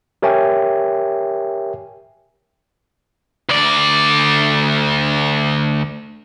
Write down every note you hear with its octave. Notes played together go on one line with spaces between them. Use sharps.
G4 A#4 C#5 E5 G5 G#5
D2 D5